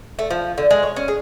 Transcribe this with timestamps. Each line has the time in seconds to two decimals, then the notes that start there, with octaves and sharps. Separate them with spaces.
0.19 A3
0.31 F3
0.58 D3
0.71 G#3
0.83 C#5
0.96 C#4
1.08 G#4